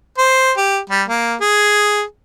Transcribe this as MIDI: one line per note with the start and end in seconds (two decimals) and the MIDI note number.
0.18 0.52 72
0.57 0.79 67
0.90 1.03 55
1.08 1.35 58
1.41 2.03 68